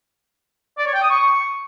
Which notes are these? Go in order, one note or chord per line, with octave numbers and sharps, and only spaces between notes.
D5
C#5
G5
D#6
C#6